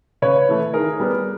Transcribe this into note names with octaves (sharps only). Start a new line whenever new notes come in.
C#3 B4 C#5
E3 A3
D#3 G#4 A#4
G3 B3